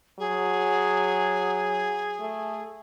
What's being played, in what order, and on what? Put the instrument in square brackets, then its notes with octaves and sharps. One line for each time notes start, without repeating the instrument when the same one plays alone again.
[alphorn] F#3 [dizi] G#4
[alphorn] A3